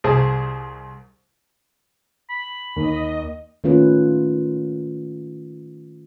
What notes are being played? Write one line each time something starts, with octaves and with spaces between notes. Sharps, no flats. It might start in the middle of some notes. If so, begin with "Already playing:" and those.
C2 G#4 C5 A5
B5
D#2 D#5
D#3 A3 A#3 C#4 F4 B4